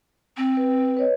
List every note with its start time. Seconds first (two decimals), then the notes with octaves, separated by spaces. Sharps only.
0.37 C4
0.57 B4
0.97 B4 C#5 D#5